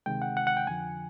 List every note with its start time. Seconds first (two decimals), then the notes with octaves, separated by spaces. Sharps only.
0.06 D2 C3 D#3 G#3 G5
0.22 F#5
0.37 F#5
0.47 F#5
0.57 G5
0.67 F2 D3 F3 G#5